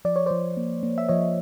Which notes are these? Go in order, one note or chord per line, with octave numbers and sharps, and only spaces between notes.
F3 D5
C#5
F3 C5 D5
A#3
A#3
E5
F3 C#5 D#5